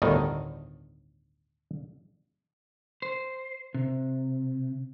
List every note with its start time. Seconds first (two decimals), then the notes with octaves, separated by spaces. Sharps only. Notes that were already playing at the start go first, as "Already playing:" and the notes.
0.02 G1 D2 A2 D#3 D#4
3.02 C5
3.74 C3